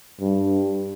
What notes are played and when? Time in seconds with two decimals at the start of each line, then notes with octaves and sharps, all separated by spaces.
0.20 G2